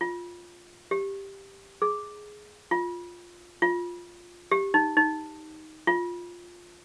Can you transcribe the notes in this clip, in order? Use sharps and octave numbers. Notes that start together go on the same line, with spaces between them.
F4
G4
G#4
F4
F4
G4
D#4
D#4
F4